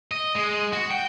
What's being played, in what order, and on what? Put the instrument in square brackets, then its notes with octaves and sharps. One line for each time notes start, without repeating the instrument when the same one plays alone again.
[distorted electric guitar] D#5
G#3
F#4
G5